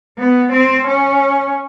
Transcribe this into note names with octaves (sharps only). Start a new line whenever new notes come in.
B3
C4
C#4